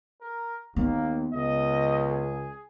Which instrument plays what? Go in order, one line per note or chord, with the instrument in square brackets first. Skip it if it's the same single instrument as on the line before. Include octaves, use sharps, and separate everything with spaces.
[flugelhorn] A#4
[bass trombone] D#2 [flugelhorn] A#3 [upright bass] B3
[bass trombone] C#2 [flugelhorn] D#5
[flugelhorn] G#4